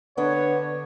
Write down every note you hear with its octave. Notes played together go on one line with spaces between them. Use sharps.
D3 B3 D4 C#5